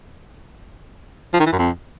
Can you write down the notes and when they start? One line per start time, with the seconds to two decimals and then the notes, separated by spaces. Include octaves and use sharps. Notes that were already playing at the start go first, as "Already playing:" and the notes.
1.33 F3
1.40 D#3
1.46 E3
1.52 F#2
1.59 F2